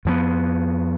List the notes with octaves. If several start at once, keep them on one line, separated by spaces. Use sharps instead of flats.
F2 F3 B3